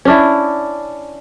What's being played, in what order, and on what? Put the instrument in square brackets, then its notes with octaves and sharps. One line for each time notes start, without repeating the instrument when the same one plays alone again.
[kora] C#4 D4 E4